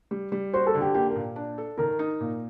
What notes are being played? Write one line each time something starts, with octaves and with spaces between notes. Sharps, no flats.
G3
G3
F#4 C5
A4
D3
G4
A#3 G4
A#4
A#2
D4
A4
D#3 A#4
D#4
A#2